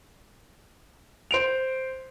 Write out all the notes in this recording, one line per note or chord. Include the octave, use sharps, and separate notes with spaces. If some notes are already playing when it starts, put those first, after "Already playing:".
C5 D7 F7